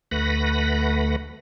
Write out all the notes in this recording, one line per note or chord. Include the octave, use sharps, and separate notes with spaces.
D2 A3 B4 F#5 B5 A#6